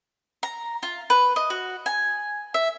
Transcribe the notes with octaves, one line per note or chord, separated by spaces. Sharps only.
A#5
F4
B4
D#5
F#4
G#5
E5